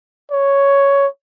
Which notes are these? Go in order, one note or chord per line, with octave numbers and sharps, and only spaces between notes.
C#5